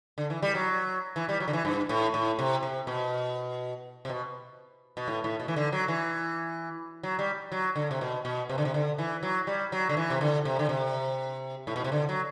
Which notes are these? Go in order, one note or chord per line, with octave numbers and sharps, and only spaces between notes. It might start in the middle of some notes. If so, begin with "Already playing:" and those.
D3
E3
G3
F#3
E3
G3
F#3
D3
E3
G2
A2
A2
C3
C3
B2
C3
B2
B2
A2
A2
B2
E3
D3
F#3
E3
F#3
G3
F#3
D3
C3
B2
B2
C3
D3
C3
D3
E3
F#3
G3
F#3
D3
E3
C3
D3
C3
D3
C3
A2
B2
C3
D3
F#3